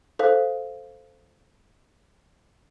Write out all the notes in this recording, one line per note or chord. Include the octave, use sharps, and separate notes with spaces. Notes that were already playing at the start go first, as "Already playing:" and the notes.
A4 C5 F5